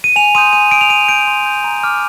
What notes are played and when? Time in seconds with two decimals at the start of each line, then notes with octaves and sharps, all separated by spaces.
0.04 D#7
0.16 G#5 F7
0.35 C6 D#6 G6 D#7
0.53 G#5 D#7
0.71 C6 D#6 G6 D7
0.81 F7
0.90 C6 D#7
1.08 G6 D7
1.27 C6
1.46 G6
1.64 A#5
1.83 D6 F6